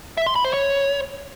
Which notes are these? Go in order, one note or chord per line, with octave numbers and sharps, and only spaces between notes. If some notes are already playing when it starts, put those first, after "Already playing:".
E5
C6
B5
C5
C#5